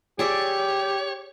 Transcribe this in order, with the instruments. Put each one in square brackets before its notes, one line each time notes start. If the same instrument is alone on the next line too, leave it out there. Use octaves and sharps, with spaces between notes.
[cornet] G4 [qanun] G#4 D5 E5 [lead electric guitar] C#5